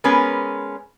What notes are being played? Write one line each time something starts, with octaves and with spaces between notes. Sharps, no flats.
G#3 B3 C#4 A#4 B4